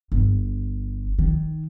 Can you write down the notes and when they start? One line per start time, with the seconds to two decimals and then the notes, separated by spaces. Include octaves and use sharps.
0.12 G1
1.19 D#3